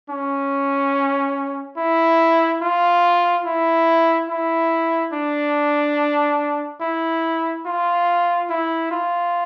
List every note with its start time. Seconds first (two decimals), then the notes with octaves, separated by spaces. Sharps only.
0.10 C#4
1.77 E4
2.62 F4
3.46 E4
4.29 E4
5.13 D4
6.81 E4
7.66 F4
8.50 E4
8.91 F4